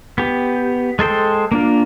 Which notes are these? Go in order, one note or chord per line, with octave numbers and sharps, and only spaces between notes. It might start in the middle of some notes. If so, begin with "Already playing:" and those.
B3 G4
G#3 A4 C5 G5
A#3 D4 F4